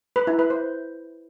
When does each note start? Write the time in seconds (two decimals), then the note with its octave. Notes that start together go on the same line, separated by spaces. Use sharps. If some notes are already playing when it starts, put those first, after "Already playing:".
0.16 B4
0.27 E4
0.39 B4
0.50 C5